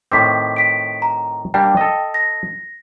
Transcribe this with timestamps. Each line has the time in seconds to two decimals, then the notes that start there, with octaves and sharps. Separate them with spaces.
0.12 A2 D#3 C4 D6 B6
0.56 B6 D7
1.02 A#5
1.54 G3 A#3 D4 G5
1.77 A4 D#5
2.14 A#6